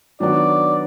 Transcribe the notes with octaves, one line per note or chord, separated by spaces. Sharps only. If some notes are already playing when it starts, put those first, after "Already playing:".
D#3 F#3 B3 D4 F#4 D5